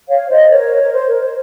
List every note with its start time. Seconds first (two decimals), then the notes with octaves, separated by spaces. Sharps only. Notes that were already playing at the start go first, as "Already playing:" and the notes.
0.08 C#5 F5
0.29 C5 D#5
0.50 A#4 C#5
0.82 A#4
0.92 C5
1.07 A#4
1.21 C5